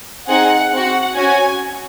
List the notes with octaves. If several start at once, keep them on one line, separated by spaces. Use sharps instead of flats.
C4 D#4 G#4 F#5
C4 F#4 F#5
C#4 F#4 G#5